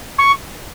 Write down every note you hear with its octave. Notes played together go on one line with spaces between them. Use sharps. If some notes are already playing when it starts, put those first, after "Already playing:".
C#6